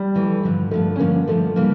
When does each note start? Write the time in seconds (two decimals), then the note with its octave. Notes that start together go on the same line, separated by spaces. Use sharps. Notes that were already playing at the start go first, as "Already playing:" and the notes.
Already playing: G3
0.14 F2 E3 A3
0.43 G2 D3 F3
0.71 G2 D3 F3 A3
0.96 C#4
0.99 G2 D3 F3 A#3
1.27 G2 D3 F3 A3
1.56 C#3 E3 G3 A#3